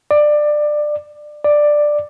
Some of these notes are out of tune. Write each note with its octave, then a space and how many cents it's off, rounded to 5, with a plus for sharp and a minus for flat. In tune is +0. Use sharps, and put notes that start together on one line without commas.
D5 +20
D5 +10